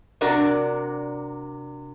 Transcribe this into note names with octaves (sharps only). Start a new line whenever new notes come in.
C3 D4 F#4 A#4 D5